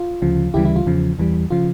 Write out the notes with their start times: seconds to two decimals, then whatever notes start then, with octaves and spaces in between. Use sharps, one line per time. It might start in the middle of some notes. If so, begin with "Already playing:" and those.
Already playing: F4
0.22 D2 C#3 F3
0.54 D2 C#3 E3 G3 E4 G4
0.65 E4
0.76 F4
0.86 E2 C#3 F3
1.19 E2 E3 G3
1.50 C#3 F3 F4